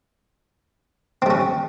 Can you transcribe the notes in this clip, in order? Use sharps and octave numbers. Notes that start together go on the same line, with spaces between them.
G3 C4 C#4